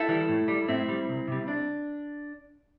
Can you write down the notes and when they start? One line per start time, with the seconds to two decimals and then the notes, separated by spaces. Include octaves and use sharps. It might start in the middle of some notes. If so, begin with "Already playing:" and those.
Already playing: E4 A4
0.08 E3 G3
0.29 A2
0.48 G3
0.68 A2 C4 E4
0.88 G3
1.09 C2
1.28 C3 G3
1.48 D4